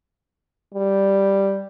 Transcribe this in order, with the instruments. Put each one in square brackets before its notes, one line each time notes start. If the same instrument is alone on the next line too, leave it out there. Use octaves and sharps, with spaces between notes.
[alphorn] G3